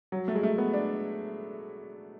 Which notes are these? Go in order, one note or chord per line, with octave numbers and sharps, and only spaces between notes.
F#3
A3
G#3
A3
B3
D4